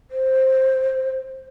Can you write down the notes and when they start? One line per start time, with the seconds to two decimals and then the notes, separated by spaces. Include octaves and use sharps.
0.11 C5